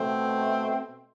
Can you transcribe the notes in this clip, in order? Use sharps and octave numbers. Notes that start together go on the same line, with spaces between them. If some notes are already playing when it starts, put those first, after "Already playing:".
Already playing: B2 A3 C4